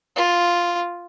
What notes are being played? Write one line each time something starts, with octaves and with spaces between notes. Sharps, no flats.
F4